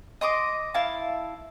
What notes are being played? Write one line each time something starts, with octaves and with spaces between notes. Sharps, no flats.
D#5 C6 D6 D#6
E4 F5 A5